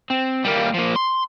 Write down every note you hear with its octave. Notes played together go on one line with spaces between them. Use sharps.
C4
G3 A#3
F3 A#3
C6